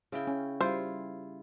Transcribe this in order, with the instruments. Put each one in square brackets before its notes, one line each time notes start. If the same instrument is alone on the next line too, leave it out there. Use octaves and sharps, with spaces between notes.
[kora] C#3 E4 G5
[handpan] C#4
[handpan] G3 [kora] E4 F4 [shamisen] C5